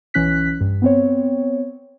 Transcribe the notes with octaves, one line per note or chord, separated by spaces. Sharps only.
B1 E3 C#4 F#6 B6
G2
B3 C4 C#5